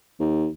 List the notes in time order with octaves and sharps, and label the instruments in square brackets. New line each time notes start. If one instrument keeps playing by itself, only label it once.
[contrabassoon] D#2